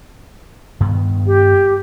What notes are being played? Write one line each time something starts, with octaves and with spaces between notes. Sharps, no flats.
G2 D#3 B3
G4